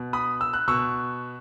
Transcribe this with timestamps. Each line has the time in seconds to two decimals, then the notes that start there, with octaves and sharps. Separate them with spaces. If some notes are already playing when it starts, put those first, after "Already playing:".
Already playing: B2
0.13 B5 D#6
0.41 E6
0.53 F#6
0.68 B2 C#6 E6